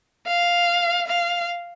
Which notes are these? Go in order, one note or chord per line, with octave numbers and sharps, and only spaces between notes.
F5
F5